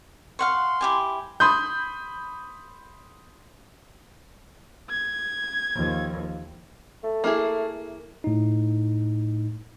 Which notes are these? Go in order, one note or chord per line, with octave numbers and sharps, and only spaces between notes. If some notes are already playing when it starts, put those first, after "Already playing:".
F5 F#5 C6 C#6
E4 G4 G#5
B5 C6 D#6 G6
G#6
D#2 F3
A3
A#3 E4 G#4
A2 D#4